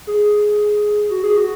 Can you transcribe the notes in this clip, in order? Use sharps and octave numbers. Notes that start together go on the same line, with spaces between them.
G#4
F#4
G#4
F#4